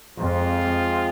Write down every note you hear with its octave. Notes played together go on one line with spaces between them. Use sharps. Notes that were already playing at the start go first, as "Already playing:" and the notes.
F2 F3 G#3 C4 F4